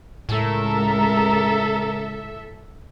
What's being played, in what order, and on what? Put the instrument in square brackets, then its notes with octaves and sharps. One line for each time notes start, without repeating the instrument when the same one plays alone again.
[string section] C#2 A#4 [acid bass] A2 [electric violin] A4 E5